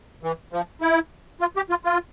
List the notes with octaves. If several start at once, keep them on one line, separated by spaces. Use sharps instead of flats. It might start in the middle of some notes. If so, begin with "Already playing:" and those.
E3
F3
E4
F4
G4
F4
F4